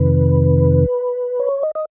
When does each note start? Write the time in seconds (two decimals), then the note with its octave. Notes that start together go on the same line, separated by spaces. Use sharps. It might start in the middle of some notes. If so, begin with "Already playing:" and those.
Already playing: F2 C3 D#3 B4
1.40 C#5
1.63 D#5
1.75 D#5